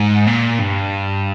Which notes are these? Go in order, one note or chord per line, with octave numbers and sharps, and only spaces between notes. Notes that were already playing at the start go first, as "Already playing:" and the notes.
Already playing: G#2
A#2
G2